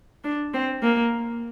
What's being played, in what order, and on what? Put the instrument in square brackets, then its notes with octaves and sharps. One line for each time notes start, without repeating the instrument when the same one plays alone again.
[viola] D4
C4
A#3